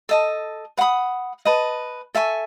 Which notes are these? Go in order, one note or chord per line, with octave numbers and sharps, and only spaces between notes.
A4 D#5 A5
B4 F#5 B5 D#6
B4 D#5 A5
A4 E5 G#5 C#6